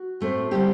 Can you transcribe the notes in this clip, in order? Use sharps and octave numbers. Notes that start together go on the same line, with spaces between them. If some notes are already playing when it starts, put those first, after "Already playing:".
Already playing: F#4
A2 A3 C4
D3 G3 C4 G4